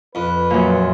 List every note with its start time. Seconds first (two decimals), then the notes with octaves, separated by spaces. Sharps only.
0.15 F2 B4
0.50 F#2 A#2